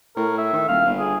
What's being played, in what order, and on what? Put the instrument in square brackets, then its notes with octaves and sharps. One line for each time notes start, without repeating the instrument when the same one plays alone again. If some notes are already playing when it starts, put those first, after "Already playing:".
[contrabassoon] A2 [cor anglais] A#4
[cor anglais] E5
[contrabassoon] D#3
[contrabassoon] D#1 [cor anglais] F5
[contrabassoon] G1
[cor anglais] G#4